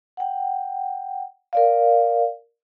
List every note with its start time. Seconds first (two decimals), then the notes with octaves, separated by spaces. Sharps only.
0.17 F#5 G5
1.53 A#4 D5 F5